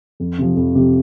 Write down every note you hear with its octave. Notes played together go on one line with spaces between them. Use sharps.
F2
C3 F3
F2
C3 F3